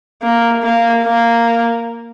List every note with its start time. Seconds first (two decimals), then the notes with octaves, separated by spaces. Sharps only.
0.23 A#3
0.63 A#3
1.04 A#3